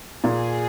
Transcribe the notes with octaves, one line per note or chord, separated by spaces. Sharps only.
A#2 G#4